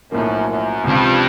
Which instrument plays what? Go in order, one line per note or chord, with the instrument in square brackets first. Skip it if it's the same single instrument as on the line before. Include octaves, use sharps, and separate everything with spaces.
[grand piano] B1 A2 F3 A#3 [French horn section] F#2
[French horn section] F#2
[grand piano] C#2 C3 F3 [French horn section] G2